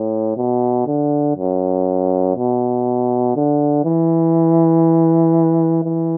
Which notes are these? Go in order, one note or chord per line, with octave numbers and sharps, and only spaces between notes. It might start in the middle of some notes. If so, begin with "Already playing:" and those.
Already playing: A2
B2
D3
F#2
B2
D3
E3
E3